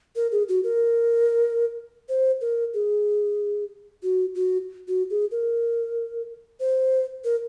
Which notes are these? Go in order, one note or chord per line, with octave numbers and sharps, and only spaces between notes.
A#4
G#4
F#4
A#4
C5
A#4
G#4
F#4
F#4
F#4
G#4
A#4
C5
A#4